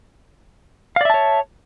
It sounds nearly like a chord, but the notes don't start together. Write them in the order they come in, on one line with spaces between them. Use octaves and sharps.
F5 D5 E5 A5 C#5